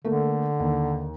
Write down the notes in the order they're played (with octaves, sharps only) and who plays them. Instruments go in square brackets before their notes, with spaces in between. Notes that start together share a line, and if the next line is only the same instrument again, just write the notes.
[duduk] D3 [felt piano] A3 A#3
[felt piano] D#2